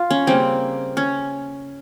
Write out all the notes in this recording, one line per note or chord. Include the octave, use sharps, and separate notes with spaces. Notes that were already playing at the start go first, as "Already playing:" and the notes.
Already playing: F4
C#4
C#3 G3 A#3 C4
C#4